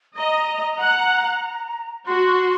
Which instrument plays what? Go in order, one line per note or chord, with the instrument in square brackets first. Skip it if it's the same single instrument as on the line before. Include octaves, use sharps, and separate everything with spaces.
[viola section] D#5 [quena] A#5
[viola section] F#5
[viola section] F#4 [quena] C6